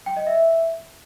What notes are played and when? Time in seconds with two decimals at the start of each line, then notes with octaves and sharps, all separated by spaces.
0.06 G5
0.17 D#5
0.27 E5